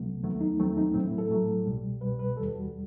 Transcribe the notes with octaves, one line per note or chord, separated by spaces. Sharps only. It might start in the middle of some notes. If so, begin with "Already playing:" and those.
Already playing: C2 C3 F#3 A3 B3
D#2 D#3 F#3 A3 B3
D#4
D#2 D#3 F#3 A3 C4
D#4
A2 F#3 A3 C4
E4
A4
A2 F#3 A3
C2 B2 G3
C2 B2 G3 B4
B4
D#2 D#3 G3 A4
F#4